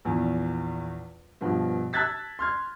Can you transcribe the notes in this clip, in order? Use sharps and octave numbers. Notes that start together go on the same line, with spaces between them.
A#1 E2
G2 B2 F3
A5 E6 F#6 G#6 A6 B6
C6 F6 G#6